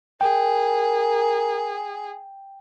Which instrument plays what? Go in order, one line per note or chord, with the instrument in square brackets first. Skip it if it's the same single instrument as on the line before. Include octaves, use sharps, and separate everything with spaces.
[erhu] G#4 [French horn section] A#4 [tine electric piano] G5